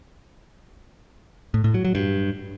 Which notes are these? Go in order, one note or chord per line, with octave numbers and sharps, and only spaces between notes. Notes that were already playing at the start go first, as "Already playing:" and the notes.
A2
A2
F#3
F#3
G2